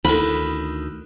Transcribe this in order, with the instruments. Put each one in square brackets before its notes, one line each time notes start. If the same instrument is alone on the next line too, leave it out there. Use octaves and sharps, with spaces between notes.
[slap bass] D2 D#3 [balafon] D#4 E4 A4 [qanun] B5